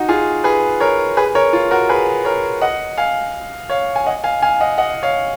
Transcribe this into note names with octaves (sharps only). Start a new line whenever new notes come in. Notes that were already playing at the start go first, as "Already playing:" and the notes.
Already playing: D#4 F#4
F4 G#4
G#4 B4
A#4 C#5
G#4 B4
A#4 C#5
F4
F#4 A#4
G#4 B4
A#4 C#5
D#5 F#5
F5 G#5
C#5 F5
G#5
D#5 F#5
F5 G#5
F5 G#5
D#5 F#5
D#5 F#5
C#5 F5